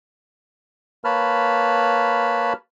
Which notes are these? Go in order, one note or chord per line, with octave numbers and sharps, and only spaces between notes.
A#3 B4 C#5 A5 B5 F6